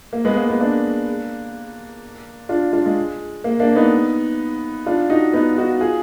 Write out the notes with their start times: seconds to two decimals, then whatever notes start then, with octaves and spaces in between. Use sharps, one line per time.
0.13 A#3
0.25 G#3 B3
0.37 A#3
0.48 G#3 B3
0.60 A#3 D4
2.49 D4 F4
2.73 D4 F4
2.86 G#3
3.44 A#3
3.60 A#3 D4
3.76 B3 D#4
4.86 D4 F4
5.10 D#4 F#4
5.33 B3 D#4
5.57 D#4 F#4
5.81 F4 G#4